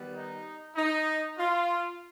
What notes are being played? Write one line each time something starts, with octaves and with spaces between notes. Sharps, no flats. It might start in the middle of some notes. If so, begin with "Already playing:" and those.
Already playing: D#3 G3 B3
D#4
D#4
F4